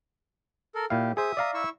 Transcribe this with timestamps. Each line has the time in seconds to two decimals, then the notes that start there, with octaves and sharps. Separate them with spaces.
0.75 A4 A#4
0.90 A#2 E4 G4 F5
1.17 G#4 C5 E5 D#6
1.37 D5 F5 A#5
1.54 E4 C#6 E6